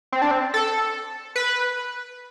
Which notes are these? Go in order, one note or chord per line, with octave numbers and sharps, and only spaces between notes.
C4
D4
C4
A4
B4